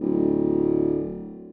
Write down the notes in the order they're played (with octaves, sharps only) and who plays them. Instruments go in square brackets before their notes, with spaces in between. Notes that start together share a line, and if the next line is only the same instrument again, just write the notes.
[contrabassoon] D1